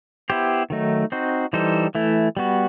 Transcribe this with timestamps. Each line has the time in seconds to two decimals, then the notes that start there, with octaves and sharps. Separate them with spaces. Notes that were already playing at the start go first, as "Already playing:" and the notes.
0.30 B3 E4 G4 C5
0.70 D#3 F#3 A3 D#4
1.12 C4 D#4 F#4 C5
1.53 E3 G3 D#4 A4 C5
1.95 E3 A3 E4
2.37 G3 B3 F#4